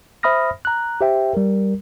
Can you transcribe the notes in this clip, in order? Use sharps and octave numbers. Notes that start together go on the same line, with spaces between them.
C5 E5 B5 D#6 F6 A#6
A#5 F#6
G4 C5 E5 G5
G3 A#4